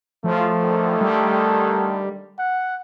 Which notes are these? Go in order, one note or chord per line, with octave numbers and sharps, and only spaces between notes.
C#3 F3 F#3 A3 F4
D3 D#3
G3
F#5